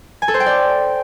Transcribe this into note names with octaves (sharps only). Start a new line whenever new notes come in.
G#5
A4
C5
G5
D5